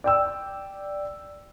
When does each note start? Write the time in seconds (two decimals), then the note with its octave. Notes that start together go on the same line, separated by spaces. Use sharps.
0.04 D5 G5 E6